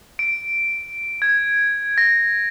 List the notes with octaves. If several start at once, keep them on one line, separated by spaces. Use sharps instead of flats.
D7
G#6
A#6